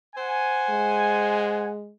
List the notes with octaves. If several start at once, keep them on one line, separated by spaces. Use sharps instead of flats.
C5 F#5 G#5
G#3